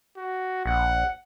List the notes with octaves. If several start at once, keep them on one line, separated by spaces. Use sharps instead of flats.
F#4
A#1 F#5